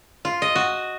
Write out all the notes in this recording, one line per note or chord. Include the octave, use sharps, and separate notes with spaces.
F4
D#5
F#4